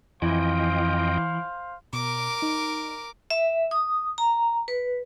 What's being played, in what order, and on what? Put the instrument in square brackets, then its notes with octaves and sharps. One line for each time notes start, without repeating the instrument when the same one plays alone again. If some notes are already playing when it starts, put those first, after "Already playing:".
[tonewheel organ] F2 D#5 G5 [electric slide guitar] E3 [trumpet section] C5 F5
[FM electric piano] B2 [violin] A#4 D6
[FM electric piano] D#4
[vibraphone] E5
D#6
A#5
B4